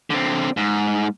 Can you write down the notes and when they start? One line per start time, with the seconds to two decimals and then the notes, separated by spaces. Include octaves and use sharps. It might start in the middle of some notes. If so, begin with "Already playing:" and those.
0.10 D3 C4
0.57 G#2